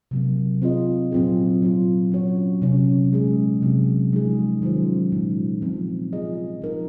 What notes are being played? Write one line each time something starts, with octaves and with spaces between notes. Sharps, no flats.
C3 F#3 A#3
C4 F4 G#4 D#5
A#2 F#3 C4 F4 G#4
F#3 C4 F4
F#3 C#4 F#4 C#5
C3 F#3 C#4
A#2 G#3 C#4 G#4
C3 F#3 C4 F#4
F3 G#3 D#4 G#4
D#3 F#3 C#4 F4 C5
A#2 G#3 D#4
A#2 F3 C4
C4 F4 G#4 D#5
F3 A#3 D#4 A#4